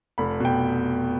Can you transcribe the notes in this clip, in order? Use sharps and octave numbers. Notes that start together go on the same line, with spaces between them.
F1 B5
B2 G5